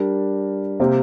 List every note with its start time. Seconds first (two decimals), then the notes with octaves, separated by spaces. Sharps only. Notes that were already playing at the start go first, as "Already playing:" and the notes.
Already playing: G3 D4 A#4 D5
0.80 C3 A#3 G4 C5